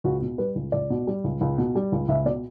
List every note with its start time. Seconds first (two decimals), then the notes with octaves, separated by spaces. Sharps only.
0.04 C#2 F#4
0.22 B2
0.38 G3 B4
0.55 C#2
0.72 C#2 D5
0.90 B2
1.07 G3
1.24 C#2
1.41 C#2
1.58 B2
1.75 G3
1.92 C#2
2.08 C#2 E5
2.25 B2 D5